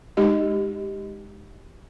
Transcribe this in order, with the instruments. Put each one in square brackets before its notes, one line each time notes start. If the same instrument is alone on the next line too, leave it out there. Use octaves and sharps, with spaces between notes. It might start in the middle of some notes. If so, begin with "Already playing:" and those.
[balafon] G#3 D#4 G4 D#5